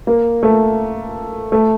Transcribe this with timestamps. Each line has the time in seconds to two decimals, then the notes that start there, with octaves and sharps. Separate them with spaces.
0.07 A#3
0.43 A3
1.52 A3